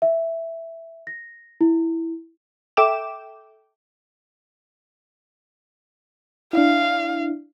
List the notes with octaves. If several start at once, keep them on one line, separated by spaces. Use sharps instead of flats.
E5
A#6
E4
A4 E5 G5 D6 E7
D4 E4 F5